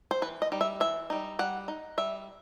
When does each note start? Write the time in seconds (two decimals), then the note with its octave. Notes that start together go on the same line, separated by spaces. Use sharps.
0.11 C5
0.22 E3 B4
0.42 D#5
0.52 G3 D#4
0.61 E5
0.80 E3 E5
1.10 G3 D#4
1.39 G3 F#5
1.68 D#4
1.98 G3 E5